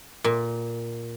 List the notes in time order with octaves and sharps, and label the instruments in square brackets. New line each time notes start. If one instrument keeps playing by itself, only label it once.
[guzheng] A#2